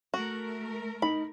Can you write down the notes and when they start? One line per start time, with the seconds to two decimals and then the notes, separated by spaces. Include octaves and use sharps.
0.14 A3 F#4 A#4
1.02 D#4 B5